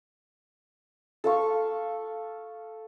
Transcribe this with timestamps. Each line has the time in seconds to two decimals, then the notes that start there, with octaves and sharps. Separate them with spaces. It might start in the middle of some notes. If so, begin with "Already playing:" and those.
1.24 A4 F5 C#6